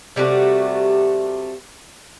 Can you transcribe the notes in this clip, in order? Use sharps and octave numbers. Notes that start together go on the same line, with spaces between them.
C3 G3 A3 F#4